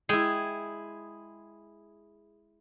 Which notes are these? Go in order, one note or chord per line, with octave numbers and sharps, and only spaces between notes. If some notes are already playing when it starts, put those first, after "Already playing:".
G#3 E4 G#4 G5